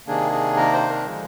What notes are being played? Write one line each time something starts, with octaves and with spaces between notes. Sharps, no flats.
C3 D#3 A#3 D4 G#4
G#4
A#4
C5
A#4
D3 F3 G#3